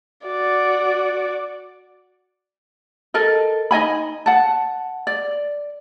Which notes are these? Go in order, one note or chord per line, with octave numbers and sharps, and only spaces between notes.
F#4 D5
A4 A#4 D#5
D#4 D#5 G#5 B5
F#5 A5
D5